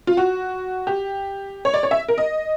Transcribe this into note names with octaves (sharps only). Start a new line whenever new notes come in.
F4
F#4
G4
C#5
D5
C#5
E5
A#4
D#5